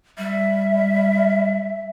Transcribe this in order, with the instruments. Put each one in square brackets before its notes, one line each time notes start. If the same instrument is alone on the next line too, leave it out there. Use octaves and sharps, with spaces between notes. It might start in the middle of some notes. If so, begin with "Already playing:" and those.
[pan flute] G3 [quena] E5